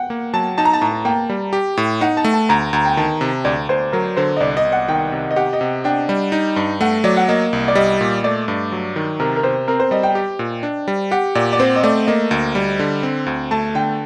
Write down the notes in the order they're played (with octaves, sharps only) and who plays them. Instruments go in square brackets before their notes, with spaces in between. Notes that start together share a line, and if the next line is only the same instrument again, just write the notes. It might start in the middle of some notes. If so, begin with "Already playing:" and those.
Already playing: [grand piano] F#5 G5
[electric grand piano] A#3
[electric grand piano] F#3 [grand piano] A5
[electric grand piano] D#4 [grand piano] A5
[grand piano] A#5
A5
[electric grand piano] A2 [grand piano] A#5
[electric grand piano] A#3 [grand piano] G5
[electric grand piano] G3
G4
A2
[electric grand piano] D#4 [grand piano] F#5
[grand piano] A5
[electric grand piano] A3
[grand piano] A5
[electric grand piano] D2 [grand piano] A#5
[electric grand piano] D2
[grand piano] G5
[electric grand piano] D#3 [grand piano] A5
[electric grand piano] C3
[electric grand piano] D2 [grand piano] D5
[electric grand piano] D2 [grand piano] C5
[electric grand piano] F#3 [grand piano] A#4
[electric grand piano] D3 [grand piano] C5
[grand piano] D#5
[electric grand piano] C2 [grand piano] D5
[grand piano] D#5
[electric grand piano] C2
[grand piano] F#5
[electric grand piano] D#3 [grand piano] G5
[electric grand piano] C3
[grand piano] D#5
[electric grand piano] G4 [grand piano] F#5
[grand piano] D#5
[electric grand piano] C3
[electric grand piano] D4 [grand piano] G5
[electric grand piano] G3
D#4
G2
[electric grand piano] A3 [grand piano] F#5
[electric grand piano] F#3 [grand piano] D5
[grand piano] F#5
[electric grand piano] A#3 [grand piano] D#5
[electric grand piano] C2
[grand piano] D5
[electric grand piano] G3 [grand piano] D#5
[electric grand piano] A#2
[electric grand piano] A3 [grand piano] D5
[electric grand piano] G2
F#3
D#3
[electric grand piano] C3 [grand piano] A#4
[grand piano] A#4
[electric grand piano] C3 [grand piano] C5
[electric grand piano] C4 [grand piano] A#4
[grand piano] C5
[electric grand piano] G3 [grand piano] D#5
[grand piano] G5
[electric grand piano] G4
A#2
D4
G3
[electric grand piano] G4 [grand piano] F#5
[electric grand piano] A#2 [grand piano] D5
[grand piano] D5
[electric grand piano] C4 [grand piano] C5
[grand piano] D#5
[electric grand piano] A3 [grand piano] D5
[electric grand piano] A#3 [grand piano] D#5
[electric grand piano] D2
G3
D3
C4
D2
[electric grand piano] A3 [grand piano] A5
[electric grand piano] D3 [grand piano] G5